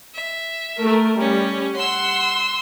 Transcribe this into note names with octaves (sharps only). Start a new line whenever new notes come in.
E5
A3 A#4
G3 C#4
F#5 C6 E6